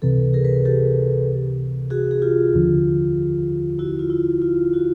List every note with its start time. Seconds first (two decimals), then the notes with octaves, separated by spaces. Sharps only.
0.02 C#2 C3 E3 A4 B4
0.33 G#4 A#4
0.45 B4
0.55 A#4
0.65 G4 A4
1.90 F#4 G#4
2.11 G#4
2.22 F4 G4
2.54 D#2 D3 F3
3.79 E4 F#4
3.99 F4
4.10 E4
4.42 F4
4.73 E4 F#4